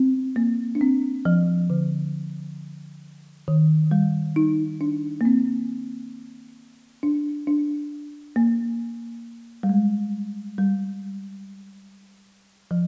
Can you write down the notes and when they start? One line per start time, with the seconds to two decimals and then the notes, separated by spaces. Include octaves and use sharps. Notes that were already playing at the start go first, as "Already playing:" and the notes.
Already playing: C4
0.36 A#3
0.75 D4
0.81 C4
1.25 F3
1.70 D3
3.48 D#3
3.91 G3
4.36 D#4
4.81 D4
5.21 A#3
5.25 C4
7.03 D4
7.47 D4
8.36 A#3
9.63 G3
9.69 G#3
10.58 G3
12.71 F3